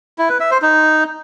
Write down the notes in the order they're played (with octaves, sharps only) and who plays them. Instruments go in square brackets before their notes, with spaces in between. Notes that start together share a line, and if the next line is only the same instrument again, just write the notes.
[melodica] E4
B4
E5
C5
D#4